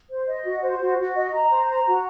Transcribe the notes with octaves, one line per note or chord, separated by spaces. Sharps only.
C5
D#5
F#4
C5
F#4
F#4
D#5
A#5
C5
A#5
F#4